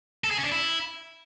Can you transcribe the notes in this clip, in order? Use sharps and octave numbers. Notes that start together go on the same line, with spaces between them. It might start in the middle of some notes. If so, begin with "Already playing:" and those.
A4
G#4
C#4
D4
E4